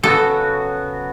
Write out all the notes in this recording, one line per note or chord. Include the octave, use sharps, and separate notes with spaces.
C#3 F#3 B3 F#4 A4